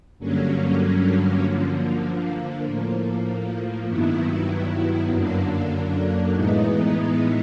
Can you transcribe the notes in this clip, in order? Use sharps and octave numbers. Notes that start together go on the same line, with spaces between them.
G2 D3 F#3 A#3 C#4
D3 F3 A#3
A2 F3 A#3
G2 D#3 F#3 B3 E4
F#2 D3 F#3 A#3 D4
A2 E3 G#3 B3 D#4